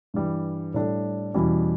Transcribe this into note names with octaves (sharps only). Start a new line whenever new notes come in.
G2 E3 G3
A2 G3 D4 A4
E2 B2 G3 C#4 E4